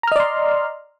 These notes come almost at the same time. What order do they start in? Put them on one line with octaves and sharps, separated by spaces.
A#5 F6 D#5 D5 C6